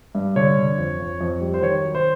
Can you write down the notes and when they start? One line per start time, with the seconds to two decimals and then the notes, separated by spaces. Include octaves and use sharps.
0.15 G2
0.36 D3 C#5
0.57 D3
0.78 F2
1.00 F2
1.21 F2
1.41 G3
1.54 C5
1.62 D#3 C#5
1.84 F#3
1.95 C5